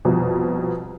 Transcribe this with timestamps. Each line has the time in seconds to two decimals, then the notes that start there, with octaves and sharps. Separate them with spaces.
0.05 C2 F2 B2